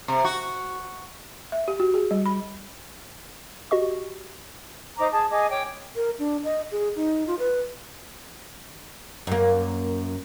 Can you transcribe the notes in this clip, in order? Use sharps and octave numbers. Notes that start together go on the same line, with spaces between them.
C3
F#4
E5
G4
F#4
G#4
G3
B5
F#4 G4 D#5 C#6
D#4 C5 A#5 D6
G#4 A5 D#6
G#4 D#5 G#5 D6
C#5 G5 D6
A#4
D4
D#5
G#4
D#4
F4
B4
F#2 A#3